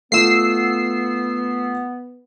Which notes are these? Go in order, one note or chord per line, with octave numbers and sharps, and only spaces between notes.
A3 B3 F4 E6 C7